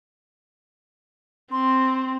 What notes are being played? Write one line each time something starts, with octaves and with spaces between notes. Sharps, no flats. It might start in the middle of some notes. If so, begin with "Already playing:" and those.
C4 C6